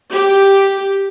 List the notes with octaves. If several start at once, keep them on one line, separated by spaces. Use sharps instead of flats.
G4